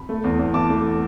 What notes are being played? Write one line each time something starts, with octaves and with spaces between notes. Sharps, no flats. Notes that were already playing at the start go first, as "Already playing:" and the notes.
Already playing: B5
A3
E2
E2
E3 A5 D6
A3